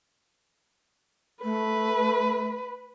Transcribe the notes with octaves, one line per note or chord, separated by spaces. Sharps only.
A3 B4